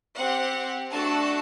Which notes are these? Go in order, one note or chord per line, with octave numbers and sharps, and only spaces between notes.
C4 G4 F#5
A3 D4 F#4 A4 A5